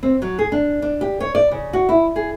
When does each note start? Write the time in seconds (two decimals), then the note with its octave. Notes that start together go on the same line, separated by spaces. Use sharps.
0.03 C4
0.22 F#3
0.39 G#4
0.52 D4
0.82 D4
1.01 G4
1.20 C#5
1.35 D5
1.51 C#3
1.73 F#4
1.89 E4
2.16 G#4